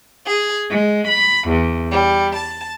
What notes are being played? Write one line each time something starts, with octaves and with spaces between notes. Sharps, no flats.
G#4
G#3
B5
E2
G3
A5